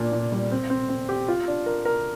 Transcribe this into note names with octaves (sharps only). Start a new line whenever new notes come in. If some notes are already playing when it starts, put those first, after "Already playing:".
Already playing: A#2 D4
A#2
G3
C4
C4
C4
G4
F4
D4
A#4
A#4